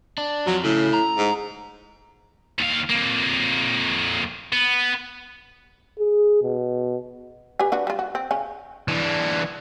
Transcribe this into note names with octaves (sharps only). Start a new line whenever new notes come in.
D4
F2 F3 F#3
A2 C#3
A#5
G#2
D#2 F5
F2 A#3
B3
G#4
B2
G4 B4 G#5
D4 F#4 B4
G3 F4
F#4
C4
C#3 C#4
E3 D4